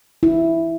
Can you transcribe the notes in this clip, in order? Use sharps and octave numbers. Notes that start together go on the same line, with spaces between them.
E4